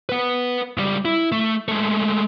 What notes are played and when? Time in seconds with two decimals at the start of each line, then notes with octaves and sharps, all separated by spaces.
0.09 B4 F#5
0.77 C#2 G3
1.05 E4
1.32 A3
1.68 G#3 A3